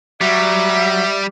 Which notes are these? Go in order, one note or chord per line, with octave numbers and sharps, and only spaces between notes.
F#3 G3 E5